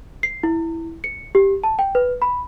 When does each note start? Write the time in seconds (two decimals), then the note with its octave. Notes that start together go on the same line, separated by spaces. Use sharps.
0.23 C7
0.43 E4
1.04 C#7
1.35 G4
1.64 A5
1.79 G5
1.95 B4
2.22 B5